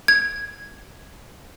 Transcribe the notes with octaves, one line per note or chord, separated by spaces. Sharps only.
G#6